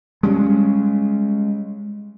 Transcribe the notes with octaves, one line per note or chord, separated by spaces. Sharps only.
G3 G#3 C#4